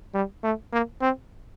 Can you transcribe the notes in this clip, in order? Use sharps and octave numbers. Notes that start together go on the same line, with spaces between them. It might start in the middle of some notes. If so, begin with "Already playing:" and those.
G3
A3
A#3
C4